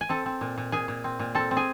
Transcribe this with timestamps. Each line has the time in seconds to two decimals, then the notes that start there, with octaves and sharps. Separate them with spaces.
0.01 G#5
0.09 C4 A4 A5
0.26 C4
0.41 A#2
0.57 A#2
0.72 A#2 G#4 G#5
0.88 A#2
1.04 C4
1.19 A#2
1.35 C4 A4 A5
1.51 C4
1.57 G#4 G#5